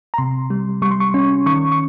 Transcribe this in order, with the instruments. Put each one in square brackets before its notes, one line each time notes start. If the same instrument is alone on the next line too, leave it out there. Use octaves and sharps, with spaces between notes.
[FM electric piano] A#5
C3 C6
G3
G3 C#6
C6
C#6
C#4
D#3 C#6
C#6